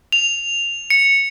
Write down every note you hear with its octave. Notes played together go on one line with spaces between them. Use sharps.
F7
C#7